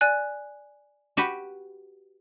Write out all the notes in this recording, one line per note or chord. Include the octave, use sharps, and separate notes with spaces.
D5 G#5 F#6
F#4 G4 B4